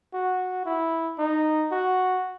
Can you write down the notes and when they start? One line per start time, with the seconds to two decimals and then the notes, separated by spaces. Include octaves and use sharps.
0.14 F#4
0.66 E4
1.19 D#4
1.72 F#4